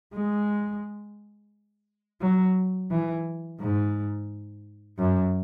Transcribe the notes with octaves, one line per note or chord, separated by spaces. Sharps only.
G#3
F#3
E3
G#2
F#2